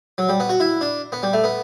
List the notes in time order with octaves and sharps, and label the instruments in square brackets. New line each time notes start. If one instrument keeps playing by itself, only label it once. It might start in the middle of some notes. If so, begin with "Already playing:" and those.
[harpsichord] F#3
G3
B3
F#4
E4
D4
B3
G3
A3
B3